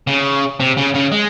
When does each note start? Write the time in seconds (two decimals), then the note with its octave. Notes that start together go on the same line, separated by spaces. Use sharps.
0.07 C#3
0.60 C3
0.77 C#3
0.94 C#3
1.12 G#3